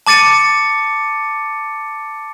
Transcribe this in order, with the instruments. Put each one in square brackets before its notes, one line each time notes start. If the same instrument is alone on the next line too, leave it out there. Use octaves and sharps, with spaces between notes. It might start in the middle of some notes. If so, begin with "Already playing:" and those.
[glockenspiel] A5 D6 A6 C#7 D#7